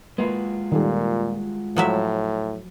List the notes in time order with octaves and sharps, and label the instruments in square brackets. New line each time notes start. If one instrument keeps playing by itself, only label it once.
[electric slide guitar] G#3 F4 F#4 [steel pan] A#3 B4
[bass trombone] A#2 [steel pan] D#3 G3 A4
[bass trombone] A2 [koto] F3 F#3 E5